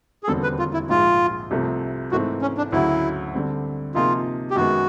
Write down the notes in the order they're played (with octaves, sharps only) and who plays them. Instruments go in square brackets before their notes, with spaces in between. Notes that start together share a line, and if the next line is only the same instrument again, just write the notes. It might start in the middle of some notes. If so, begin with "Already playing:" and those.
[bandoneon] G#4
[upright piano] E1 D#2 D3 G3 C4 [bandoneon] A4
[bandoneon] B4
F4
E4
[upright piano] A#1 G#2 F3 G#3 [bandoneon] F4
[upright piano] C2 C3 F3 A3 C4
[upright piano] G#2 E3 A3 C4 [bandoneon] F#4
[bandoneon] C#4
D4
[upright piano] D2 C#3 F#3 [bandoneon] E4
[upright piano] D3 G3 C4
[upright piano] C3 F3 A#3 D#4 G#4 [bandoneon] F4
[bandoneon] G4
[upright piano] F#2 D#3 G#3 B3 [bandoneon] F#4